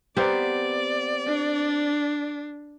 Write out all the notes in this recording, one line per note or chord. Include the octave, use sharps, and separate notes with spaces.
B3 C4 G4 A#4 D5
D4